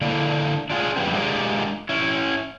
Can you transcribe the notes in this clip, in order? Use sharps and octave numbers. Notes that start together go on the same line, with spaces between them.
D3 A#3 D4 E4
D4 F4 F#4 G#4
F2 C#3 G3 B3 C4
G#3 D4 F4 G4 G#4 A#4
C#4 E4